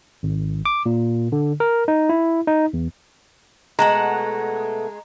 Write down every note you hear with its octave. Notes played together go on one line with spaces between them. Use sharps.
G#1
D6
A#2
D3
A#4
D#4
E4
D#4
E2
B2 G#3 A3 F#5 A#5 E7